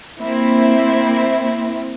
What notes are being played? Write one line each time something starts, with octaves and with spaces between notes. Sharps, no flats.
A#3 C4 E4